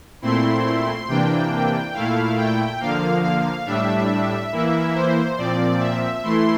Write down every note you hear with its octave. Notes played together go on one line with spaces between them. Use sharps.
A#2 A3 C4 E4 C6
C3 E3 A#3 D4 G5
A#2 A3 E4 F5
G5
D3 F3 A#3 F5
F5
A2 G3 D4 E5
E3 A#3 E4
C5
A#2 F3 C4 D5
E5
E3 A3 E4 C6